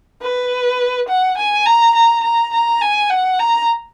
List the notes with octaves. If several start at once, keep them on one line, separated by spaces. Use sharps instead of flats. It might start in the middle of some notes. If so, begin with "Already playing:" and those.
B4
F#5
G#5
A#5
A#5
A#5
A#5
G#5
F#5
A#5